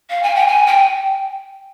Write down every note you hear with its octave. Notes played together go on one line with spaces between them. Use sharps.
F5
G#5
G5
G#5
G5